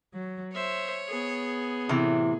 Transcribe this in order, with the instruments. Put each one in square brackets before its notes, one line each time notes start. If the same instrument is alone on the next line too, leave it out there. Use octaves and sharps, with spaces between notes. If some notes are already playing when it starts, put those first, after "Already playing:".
[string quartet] F#3
[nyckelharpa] C5 E5 [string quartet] C#5
[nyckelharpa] B3 G#4
[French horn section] A2 E4 [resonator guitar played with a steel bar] C3 E3